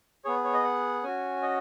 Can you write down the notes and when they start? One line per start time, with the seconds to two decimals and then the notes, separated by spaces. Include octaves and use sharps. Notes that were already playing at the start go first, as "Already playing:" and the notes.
0.25 B3 G#4 C#5
0.44 C#5
0.54 D#5
0.64 F#5
1.03 C#4 F#4 G#5
1.42 D#5